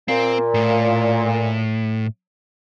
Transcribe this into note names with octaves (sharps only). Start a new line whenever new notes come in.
A#2 C4
A2